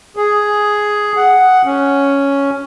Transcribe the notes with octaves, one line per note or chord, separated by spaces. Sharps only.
G#4
F#5
C#4